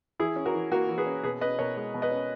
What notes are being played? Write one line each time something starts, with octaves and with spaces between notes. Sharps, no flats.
E3 E4 G#4
C#4
F#4 A#4
E3
A#3 F#4 A#4
E3
G#4 B4
C#4
B2 G#4 B4
C#4 B4 D#5
B2 A#4 C#5
G#3
B2
B4 D#5
C#4